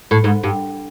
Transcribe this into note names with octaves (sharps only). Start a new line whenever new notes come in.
A2
G#2
G2